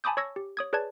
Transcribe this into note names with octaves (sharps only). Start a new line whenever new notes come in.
G#5 A5 B5 D6 D#6 G6
C#5 C#6 E6 G#6 A#6
G4
C#5 D#6 G#6
G#4 B4 C#5 D5 A5 G#6